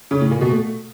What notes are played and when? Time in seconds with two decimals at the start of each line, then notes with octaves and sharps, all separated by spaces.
0.11 C#3
0.21 A2
0.31 A#2
0.41 B2
0.51 A3